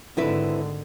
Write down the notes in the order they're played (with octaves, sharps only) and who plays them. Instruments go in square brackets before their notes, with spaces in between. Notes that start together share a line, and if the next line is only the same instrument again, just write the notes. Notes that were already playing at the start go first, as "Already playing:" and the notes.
[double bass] G#1 D3 [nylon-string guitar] C4 E4 B4